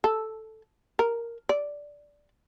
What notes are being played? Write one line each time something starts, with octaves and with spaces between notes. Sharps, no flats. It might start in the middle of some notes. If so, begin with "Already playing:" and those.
A4
A#4
D5